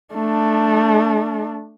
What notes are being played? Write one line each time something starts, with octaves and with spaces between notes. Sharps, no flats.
A3 D4